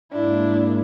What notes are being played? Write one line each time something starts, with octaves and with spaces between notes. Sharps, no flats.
G#2 G#3 A#3 D4 E4